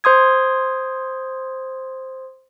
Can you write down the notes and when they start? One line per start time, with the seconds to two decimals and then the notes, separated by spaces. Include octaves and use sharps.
0.04 C5 C6 D#6 G#6